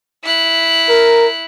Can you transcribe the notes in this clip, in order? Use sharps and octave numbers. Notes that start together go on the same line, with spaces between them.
E4 F#6
A#4